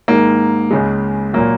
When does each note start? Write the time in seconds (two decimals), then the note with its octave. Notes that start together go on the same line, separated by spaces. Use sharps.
0.08 G#2 D#3 G#3 A#3
0.71 C#2 C#3 G#3
1.33 A#2 F#3 A#3